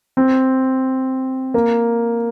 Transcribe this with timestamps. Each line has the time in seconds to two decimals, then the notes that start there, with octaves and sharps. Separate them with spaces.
0.17 C4
1.54 A#3